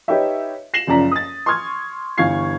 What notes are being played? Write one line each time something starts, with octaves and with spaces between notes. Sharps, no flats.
D#4 G4 B4 C#5 E5
A#6 C7 E7 F#7
F#1 F#2 F3 D5 A#5 B6
D#6 A6
C6 C#6 D#6 F6 G#6
G1 E3 F5 C#6 G#6 C7